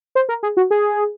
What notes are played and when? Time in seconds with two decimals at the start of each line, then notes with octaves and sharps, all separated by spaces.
0.15 C5
0.29 A#4
0.43 G#4
0.57 F#4
0.71 G#4